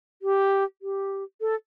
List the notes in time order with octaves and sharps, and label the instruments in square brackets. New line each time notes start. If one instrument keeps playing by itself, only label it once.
[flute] G4
G4
A4